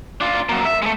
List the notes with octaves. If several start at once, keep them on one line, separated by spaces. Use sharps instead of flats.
D4 F4
F#3 A#3
E5
G#3 A3